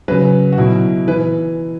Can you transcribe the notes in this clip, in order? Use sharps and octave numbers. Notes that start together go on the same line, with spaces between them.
C#3 F#3 B4
F#4
B2 F#3 E4
E3 B4